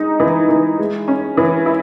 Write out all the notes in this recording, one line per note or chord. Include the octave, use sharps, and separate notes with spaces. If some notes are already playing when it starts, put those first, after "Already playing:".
Already playing: G#3 D#4
E3
E3
G#3
C#4
E3
E4